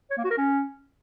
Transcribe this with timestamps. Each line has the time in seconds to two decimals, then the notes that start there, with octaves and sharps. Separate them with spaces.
0.10 C#5
0.17 A#3
0.24 F#4
0.31 A#4
0.38 C#4